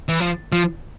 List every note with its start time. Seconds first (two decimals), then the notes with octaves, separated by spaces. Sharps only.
0.09 E3
0.20 F3
0.52 F3